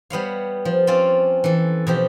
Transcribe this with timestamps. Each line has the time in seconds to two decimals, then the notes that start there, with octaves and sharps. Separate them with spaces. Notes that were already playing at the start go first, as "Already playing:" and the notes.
0.10 G3 B3 C#5 F5
0.65 F3
0.87 C4 C#4 F4 D5
1.44 E3 A4
1.87 B2 F3 G4